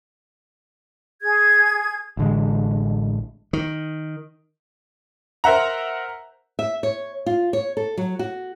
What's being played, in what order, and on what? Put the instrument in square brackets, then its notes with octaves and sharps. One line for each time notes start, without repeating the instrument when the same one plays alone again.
[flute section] G#4 G#6
[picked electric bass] A1 D3 G#3
[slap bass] D#3
[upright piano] A#4 C5 E5 F#5 A#5
[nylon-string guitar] E5
C#5
F4
C#5
A4
F#3
F#4